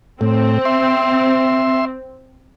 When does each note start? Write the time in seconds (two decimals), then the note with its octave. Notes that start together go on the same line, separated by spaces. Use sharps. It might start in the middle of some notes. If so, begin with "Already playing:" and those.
0.21 A2 C4
0.65 E5 C6